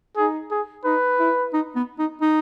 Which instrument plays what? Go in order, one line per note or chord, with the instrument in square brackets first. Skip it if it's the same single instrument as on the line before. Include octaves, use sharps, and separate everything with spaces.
[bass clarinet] D#4 [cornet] G#4
[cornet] G#4
[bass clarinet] D#4 [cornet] B4
[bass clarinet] E4
D#4
B3
D#4
D#4